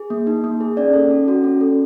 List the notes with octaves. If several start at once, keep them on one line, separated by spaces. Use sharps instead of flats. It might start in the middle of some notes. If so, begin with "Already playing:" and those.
Already playing: G#4
A#3
D#4
A#3
G#4
C#4 D5
A4
C#4
F#4
C#4
A4